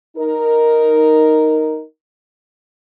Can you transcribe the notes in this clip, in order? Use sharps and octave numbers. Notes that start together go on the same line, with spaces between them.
D#4 A#4